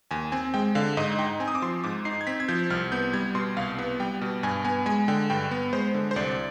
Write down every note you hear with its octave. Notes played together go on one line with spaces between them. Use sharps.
D#2 G#5
C4 G#5
G#3 G5
D3 F5
G#2 D#5
D#4 G5
C4 G#5
D#6
D6
F3 C6
G#2 D6
D#4 C7
G#6
C4 B6
G#6
F3 G6
C2 F6
B3 G6
G3 G#6
B2 C6
C2 F5
B3
G3 G5
B2
G2 G#5
B3 G#5
G#3 G#5
D3 G5
G2 G5
B3
G#3 C5
D3
C5
C2 D5